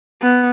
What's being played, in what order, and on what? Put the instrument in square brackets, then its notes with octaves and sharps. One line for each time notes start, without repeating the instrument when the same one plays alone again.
[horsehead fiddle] B3